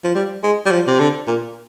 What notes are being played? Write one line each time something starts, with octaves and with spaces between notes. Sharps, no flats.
F3
G3
G#3
G3
F3
C3
D3
A#2